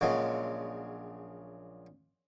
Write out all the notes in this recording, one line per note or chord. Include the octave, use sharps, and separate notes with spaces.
A#1 C#3 F#3 G#3